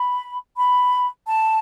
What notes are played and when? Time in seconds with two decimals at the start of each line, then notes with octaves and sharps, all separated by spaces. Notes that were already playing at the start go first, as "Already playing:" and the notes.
Already playing: B5
0.56 B5
1.26 A5